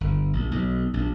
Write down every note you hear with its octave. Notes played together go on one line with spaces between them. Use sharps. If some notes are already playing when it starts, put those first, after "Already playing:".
G1
A#1
B1
A#1